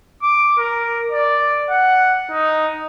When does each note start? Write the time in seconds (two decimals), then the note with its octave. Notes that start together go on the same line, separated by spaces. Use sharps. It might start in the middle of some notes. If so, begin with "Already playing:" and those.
0.22 D6
0.58 A#4
1.11 D5
1.70 F#5
2.31 D#4